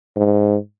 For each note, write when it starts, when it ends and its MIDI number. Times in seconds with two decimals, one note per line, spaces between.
0.16 0.57 44